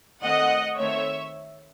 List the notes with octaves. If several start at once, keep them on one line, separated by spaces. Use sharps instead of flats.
D#3 A3 C4 D#5 F#5
D#3 A3 C4 C#5 E5